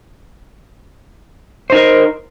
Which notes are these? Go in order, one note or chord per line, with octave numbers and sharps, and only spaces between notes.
D#4 A#4 C5